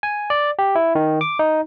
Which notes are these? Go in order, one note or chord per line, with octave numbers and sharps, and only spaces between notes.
G#5
D5
G4
E4
D#3
D6
D#4